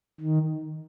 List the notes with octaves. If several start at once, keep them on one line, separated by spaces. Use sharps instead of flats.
D#3